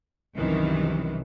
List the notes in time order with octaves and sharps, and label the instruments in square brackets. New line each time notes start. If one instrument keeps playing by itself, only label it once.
[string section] C2 F#2 C3 D#3 E3